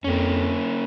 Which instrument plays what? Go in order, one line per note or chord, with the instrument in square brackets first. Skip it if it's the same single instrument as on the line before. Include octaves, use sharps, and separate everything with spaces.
[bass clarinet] F2 [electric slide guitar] A#3 C#4